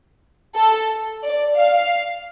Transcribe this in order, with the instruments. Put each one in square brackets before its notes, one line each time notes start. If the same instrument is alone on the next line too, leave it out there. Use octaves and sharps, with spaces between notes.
[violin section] A4
D5
F5